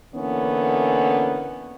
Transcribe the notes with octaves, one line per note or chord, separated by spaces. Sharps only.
D3 E3 A#3 B3 C#4